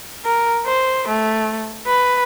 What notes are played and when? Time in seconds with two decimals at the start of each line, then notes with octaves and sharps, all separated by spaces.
0.25 A#4
0.66 C5
1.08 A3
1.87 B4